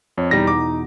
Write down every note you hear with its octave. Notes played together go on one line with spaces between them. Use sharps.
F2 C#5
E2 B2 G3 D#4 A#6
D6